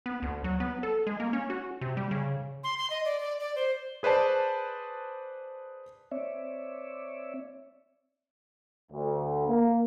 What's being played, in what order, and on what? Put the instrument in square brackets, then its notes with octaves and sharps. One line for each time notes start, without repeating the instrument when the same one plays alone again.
[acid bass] B3
D2
F#3
B3
A4
G#3
A#3
C#4
F#4
C3
G3
C#3
[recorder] C6
C6
D#5
D5
D5
D5
C5
[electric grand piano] G#4 B4 C5 D5 A5
[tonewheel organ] C4 C#5 D5 E5
[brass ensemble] D2
A#3